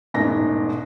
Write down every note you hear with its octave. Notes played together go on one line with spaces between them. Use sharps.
E1 A1 G#2 A#6